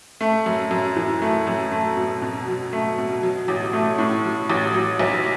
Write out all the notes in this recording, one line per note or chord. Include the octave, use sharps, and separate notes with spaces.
A3
F#2
F#2
E3
A3
F#2
A3
B2
B2
F#3
A3
B2
F#3
A1
A3
A2
F#3
A1
F#3
B1